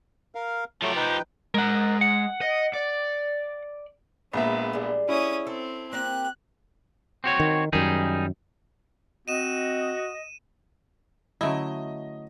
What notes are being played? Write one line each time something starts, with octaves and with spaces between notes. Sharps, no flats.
A#4 F5
F3 F#3 A3 G4
D#4 B4 G5
G#3 A#4 F#5 A#5
F#5
D#5
D5
A#1 G#3 B3 E5 A#5
G3 G#4
C#4 E4 D#6
C4 A4
A#3 C4 G4 F#6
C4 F#4 C#5
D#3
F#2 D#3 G3 D#4 G#4
C4 F#4 D#5 D#7 E7
D3 F#3 A3 C#4 E4 D#5